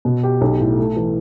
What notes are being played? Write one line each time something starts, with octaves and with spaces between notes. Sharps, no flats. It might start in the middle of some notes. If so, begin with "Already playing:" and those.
B2
G4
B1
A2
A3
E3